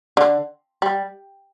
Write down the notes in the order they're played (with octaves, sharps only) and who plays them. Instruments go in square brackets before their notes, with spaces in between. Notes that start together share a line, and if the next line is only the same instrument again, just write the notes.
[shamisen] D3
G3